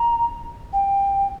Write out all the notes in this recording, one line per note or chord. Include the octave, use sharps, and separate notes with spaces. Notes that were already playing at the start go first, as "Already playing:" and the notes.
Already playing: A#5
G5